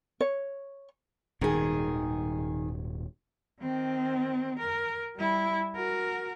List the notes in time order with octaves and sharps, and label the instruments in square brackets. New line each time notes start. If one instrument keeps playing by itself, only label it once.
[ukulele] C#5
[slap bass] D#1 G#2 B2 [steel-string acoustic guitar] D#3 G#4
[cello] D#3 C4
A#4
G3 E4
F#4 A#4